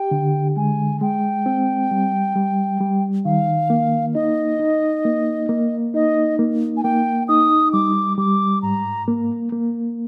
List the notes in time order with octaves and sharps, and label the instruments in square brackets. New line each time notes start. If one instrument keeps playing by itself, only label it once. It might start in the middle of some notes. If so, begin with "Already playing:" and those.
Already playing: [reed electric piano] G4 [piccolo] G5
[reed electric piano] D3
[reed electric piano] G#3 [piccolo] G#5
[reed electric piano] G#3 [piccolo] G5
[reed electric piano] C4
G3
G3
G3
[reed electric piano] D#3 [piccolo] F5
[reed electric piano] A#3
[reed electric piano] D#4 [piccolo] D#5
[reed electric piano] D#4
A#3
A#3
[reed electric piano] D#4 [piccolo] D#5
[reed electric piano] A#3
[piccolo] G#5
[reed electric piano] A#3 [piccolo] G5
[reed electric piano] D#4 [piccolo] D#6
[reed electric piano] G3 [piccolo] D6
[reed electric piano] G3 [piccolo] D6
[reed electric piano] G#2 [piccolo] A#5
[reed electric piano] A#3
A#3